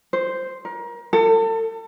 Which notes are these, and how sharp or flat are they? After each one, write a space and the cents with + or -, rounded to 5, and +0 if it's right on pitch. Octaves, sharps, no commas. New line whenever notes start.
C5 -5
A#4 +30
A4 +35